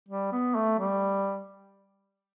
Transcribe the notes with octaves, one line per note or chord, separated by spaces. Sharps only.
G3
B3
A3
G3